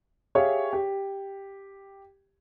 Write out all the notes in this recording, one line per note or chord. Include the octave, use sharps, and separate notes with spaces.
G4 G#4 C#5 E5 F5
G4